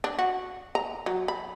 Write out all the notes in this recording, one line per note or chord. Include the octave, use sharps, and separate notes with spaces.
D4
F#4
A#5
F#3
B5